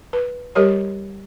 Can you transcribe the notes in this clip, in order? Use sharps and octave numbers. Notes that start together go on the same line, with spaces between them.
B4
G3 G4 A#4 C#5